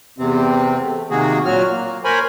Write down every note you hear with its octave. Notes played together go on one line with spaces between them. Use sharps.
E2 C3 C4
A3
C3 D#3 A#3 F#4 G#4
A#2 F#3 F#4 F6
A#3
A#4 C5 C#5 G#5 B5